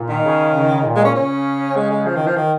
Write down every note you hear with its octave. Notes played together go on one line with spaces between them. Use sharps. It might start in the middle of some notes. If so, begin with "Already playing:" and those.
Already playing: A#2
D#3
C#3
C#3
A#2
G#3
C#4
C#3 C#4
G#3
G#3
F3
D#3
F3
D#3